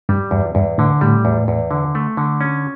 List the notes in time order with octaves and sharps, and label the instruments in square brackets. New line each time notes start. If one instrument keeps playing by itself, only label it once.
[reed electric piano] G2 [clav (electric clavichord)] G3
[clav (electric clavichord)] E2 [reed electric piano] G2
[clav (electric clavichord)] E2 [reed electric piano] G2
[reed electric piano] A2 [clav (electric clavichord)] D3
[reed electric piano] A2 [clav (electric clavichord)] G3
[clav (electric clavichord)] E2
E2
D3
A3
D3
C#4